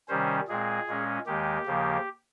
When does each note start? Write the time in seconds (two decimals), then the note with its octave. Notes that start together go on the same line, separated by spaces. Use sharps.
0.08 C3 D#3 G3 C#4 C5
0.48 A#2 G#3 C4 G#4
0.87 A#2 G#3 C#4
1.26 D#2 D#3 G#3 G4
1.66 D#2 C#3 F3 A#3